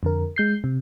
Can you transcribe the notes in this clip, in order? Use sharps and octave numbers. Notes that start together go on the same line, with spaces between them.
F2 D3 A#4
G#3 G6 C7
C3